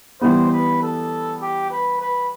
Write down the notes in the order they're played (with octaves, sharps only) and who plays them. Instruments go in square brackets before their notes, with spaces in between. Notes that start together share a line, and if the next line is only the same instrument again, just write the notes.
[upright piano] E3 G3 B3 [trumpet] C5
[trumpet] B4
A4
G4
B4
B4